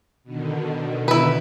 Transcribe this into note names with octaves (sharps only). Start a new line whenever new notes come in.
B2 D3 D#3
E4 B4